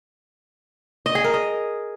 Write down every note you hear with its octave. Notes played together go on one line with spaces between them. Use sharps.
D#5
G#4
A#4
D#5